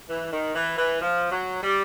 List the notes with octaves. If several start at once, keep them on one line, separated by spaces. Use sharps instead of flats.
E3
D#3
E3
E3
F3
F#3
G3